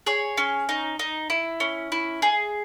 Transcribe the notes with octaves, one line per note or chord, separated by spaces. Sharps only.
G#4 C#5
C#4
D#4
D#4
E4
C#4
E4
G#4